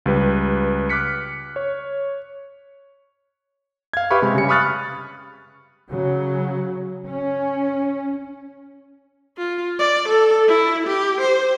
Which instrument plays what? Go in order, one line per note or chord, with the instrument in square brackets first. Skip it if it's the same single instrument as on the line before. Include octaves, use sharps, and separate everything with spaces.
[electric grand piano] C#2 G3 B4
D6 F6 F#6 B6 C#7
C#5
F5 G#6
G4 B4 E5 F5 B5 C#6
C3 G#3
C#3 G3 C#7
B5 C#6 D#6 F6 F#6 A6
[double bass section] C#3 F#3
C#4
[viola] F4
D5
A4
E4
G4
C5